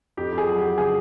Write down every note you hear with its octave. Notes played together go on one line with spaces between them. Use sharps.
F2 G4
F2
G#4
F#3
G4
F#3
C#3 G#4